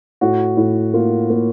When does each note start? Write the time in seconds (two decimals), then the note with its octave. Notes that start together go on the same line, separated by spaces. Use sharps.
0.21 A2 F#4
0.57 A2
0.94 A#3 F4
1.30 A#3